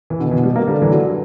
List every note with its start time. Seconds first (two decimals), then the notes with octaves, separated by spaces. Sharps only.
0.10 E3
0.20 B2 D3
0.31 E3
0.44 G3
0.56 A#3
0.67 D3 G3
0.82 E3
0.91 F#3